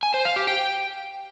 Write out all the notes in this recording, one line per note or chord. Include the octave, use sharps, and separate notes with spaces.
G#5
C5
F5
G4
G5